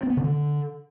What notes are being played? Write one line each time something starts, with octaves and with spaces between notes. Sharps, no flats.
C4
B3
C#3
D3